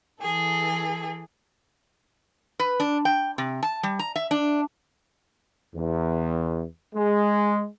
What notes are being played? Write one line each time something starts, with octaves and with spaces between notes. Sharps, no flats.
E3 G#4 A4
B4
D4
G5
C3
A5
G3
A#5
E5
D4
E2
G#3